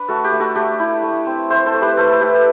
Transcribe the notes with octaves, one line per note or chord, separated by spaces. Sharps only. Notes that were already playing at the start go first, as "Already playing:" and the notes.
Already playing: D4 B4
A3 F#4 A4
G4
A3
F#4 A4
A3 G4
E4
A3
C4
A3 C5 E5
A4 C5
A3
G4 B4
A3 A4 C5
A4
E4 G4 B4